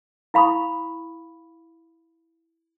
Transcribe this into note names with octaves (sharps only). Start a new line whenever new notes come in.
E4 F5 B5 C#6 D#6